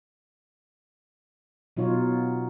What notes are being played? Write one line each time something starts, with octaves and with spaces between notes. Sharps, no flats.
B2 F#3 D#4 F4 C#5